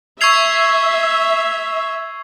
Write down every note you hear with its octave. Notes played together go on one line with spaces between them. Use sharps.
E5 C#6 E6 G#6 C7 F7